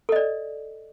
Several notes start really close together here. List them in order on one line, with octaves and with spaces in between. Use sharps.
A4 D#5 D5